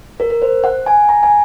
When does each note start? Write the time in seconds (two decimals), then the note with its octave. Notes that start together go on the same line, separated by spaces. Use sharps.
0.20 A#4
0.30 A#4
0.42 C5
0.64 F#5
0.86 G#5
1.09 A#5
1.23 G#5